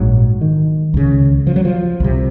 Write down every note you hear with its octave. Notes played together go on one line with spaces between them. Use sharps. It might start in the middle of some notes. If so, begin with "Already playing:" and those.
Already playing: A#1 G#2 F#3
D#3
C#2 C#3
F3
F#3
F3
C2 C3